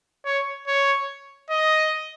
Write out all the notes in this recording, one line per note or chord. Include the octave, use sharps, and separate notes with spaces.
C#5
C#5
D#5